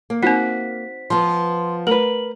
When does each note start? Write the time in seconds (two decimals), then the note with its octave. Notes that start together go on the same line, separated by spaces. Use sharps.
0.10 A#3
0.23 C4 D#4 F#4 C5 B6
1.10 F3 B3 C6
1.87 A3 A#4 B4 F#7